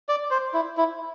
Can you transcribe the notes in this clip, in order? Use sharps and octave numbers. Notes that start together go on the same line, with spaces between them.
D5
C5
E4
E4